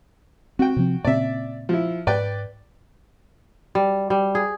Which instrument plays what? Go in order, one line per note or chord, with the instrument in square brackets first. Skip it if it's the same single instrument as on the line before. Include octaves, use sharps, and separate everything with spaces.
[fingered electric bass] C4 [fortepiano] F#4 G5
[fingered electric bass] C3 F3 C4
[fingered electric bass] A#2 C#3 C4 [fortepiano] D5 E5
[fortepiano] F3 E4
[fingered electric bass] G#2 [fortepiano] B4 D5 G5
[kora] G3
G3
G#4